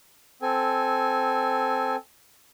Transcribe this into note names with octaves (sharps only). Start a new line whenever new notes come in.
C4 A4 G#5